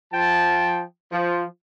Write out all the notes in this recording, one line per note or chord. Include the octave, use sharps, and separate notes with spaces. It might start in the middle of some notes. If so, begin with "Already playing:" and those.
F3 G5 A5
F3